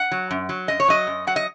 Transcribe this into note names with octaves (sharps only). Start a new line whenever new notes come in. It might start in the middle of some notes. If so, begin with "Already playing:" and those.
Already playing: F#5
F#3
F#2
F#3
F#2 D#5
C#5
F#3 D#5
F#2
F#3 F#5
D#5